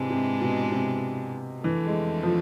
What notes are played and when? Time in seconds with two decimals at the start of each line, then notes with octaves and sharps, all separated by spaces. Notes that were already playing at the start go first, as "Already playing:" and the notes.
Already playing: G#2 C3 E3 G#3 D4
0.10 C3
0.41 B2
0.72 C3
1.63 F2 D3 E3 A3
1.87 G#3
2.23 F3